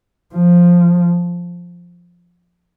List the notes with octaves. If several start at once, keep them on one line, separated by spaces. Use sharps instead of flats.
F3